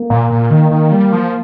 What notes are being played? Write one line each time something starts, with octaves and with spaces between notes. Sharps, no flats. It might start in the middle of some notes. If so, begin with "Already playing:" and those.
Already playing: A#3
A#2
A#2
D#3
D#3
G3
F3